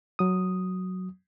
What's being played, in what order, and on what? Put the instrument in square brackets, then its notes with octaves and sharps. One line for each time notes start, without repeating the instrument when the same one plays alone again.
[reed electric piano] F#3 D#6